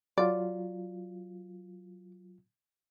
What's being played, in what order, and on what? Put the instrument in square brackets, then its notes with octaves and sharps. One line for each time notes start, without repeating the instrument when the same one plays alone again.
[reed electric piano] F#3 F4 [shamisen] D5